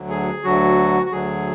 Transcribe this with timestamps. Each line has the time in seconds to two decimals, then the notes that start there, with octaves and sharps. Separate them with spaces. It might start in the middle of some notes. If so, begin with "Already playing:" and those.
Already playing: D2 D3 F#3
0.10 G#4
0.44 D2 D3 F#3 F#4
1.06 F#4
1.12 D2 D3 F#3 G#4